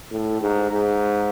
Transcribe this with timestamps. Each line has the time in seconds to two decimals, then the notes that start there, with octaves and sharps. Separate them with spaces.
0.12 A2
0.41 G#2
0.70 G#2